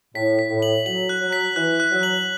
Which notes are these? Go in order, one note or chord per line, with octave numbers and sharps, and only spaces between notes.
A2 B6
B6
A2
F#7
F#3 F#7
F#6
F#3
B6
E3 F#6
F#6
F#3
F#7